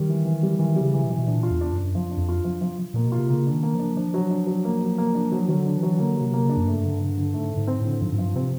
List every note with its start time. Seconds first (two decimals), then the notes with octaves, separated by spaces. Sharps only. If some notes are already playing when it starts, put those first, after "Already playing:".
Already playing: D#3 G3
0.09 E3
0.25 E3
0.43 G3
0.59 D#3 E3
0.76 G3
0.81 C#3
0.94 E3
1.04 B2
1.11 E3
1.18 B2
1.27 A#2 D4
1.43 F4
1.50 E2
1.61 D4
1.72 F#2
1.77 D4
1.95 F3
2.11 D4
2.17 F2
2.29 F4
2.44 F3
2.61 F3
2.79 F3
2.94 A#2 A#3
3.06 B2
3.12 F4
3.17 C3
3.29 C#3 A#3
3.47 D#3 D4
3.63 A#3
3.75 F3 D4
3.97 F3 D4
4.14 F#3
4.30 D4
4.47 F#3
4.65 A#3
4.80 F#3
4.98 A#3
5.15 D4
5.32 F3 F#3
5.48 D#3 F#3
5.55 D3
5.66 D4
5.77 E3
5.83 F#3
5.99 D3 A#3
6.17 C3 F#3
6.33 A#3
6.45 C#3 D4
6.56 F#2
6.66 G2 A3
6.83 D3
7.01 D3
7.17 D3
7.34 G#2 A3
7.51 D3
7.57 G#2
7.67 C4
7.80 A2 D3
8.01 G#2 F3
8.12 G#2
8.18 G2 F3
8.35 C3 C4